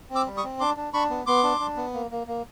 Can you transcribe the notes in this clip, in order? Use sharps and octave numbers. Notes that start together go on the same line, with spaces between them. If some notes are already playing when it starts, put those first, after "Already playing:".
C4
D6 E6
G3
C#6 D#6
C4
D4 C6 D6
D4
D4 B5 C#6
B3
B3 C6 D6
D4
D4
B3
A#3
A#3
A#3